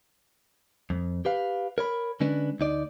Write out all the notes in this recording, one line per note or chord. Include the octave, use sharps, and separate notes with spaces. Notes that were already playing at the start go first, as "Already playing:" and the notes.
F2
G4 B4 F5
A#4 C#5 B5
D3 G#3 C#4 D4 B4
D2 D#4 D5